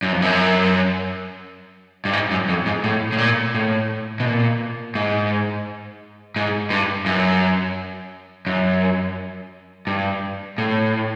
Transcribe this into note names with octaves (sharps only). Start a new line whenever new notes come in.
F#2
F2
F#2
G2
G#2
F#2
F2
G#2
A2
A2
A#2
A2
B2
A#2
G#2
G#2
G2
F#2
F#2
G2
A2